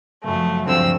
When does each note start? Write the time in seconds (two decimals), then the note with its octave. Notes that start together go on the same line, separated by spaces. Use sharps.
0.23 F#1 F#2 F3 A3
0.66 G1 D2 G2 F3 C4 E6